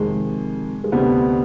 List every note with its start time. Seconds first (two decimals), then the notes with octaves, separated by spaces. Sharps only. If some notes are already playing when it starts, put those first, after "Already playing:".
Already playing: F2 C3 D#3 G#3
0.84 G#3
0.92 D2 C3 G3 B3 C4